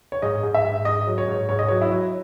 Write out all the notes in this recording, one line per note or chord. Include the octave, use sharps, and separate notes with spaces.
C#5
G#2 D#5
G#2
E5
G#2
G#2 D#5
F#3
C#5
G#2
G#2 C#5
D#5
F#3 C#5
E4
F#3